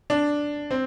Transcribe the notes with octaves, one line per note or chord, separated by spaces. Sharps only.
D4
C4